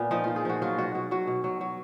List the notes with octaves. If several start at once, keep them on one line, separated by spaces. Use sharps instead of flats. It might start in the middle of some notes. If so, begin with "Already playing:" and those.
Already playing: A#2 B3
F3 D#4
F3 F4
G#4
F3 F#4
F#3 F4
B2 F#4
B2 F#4
F#3 F#4
B2
F#3
F#3